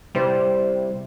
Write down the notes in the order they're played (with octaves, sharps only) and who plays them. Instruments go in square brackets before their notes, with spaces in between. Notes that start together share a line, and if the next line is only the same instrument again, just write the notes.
[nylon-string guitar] C3 E4 C5 [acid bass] G3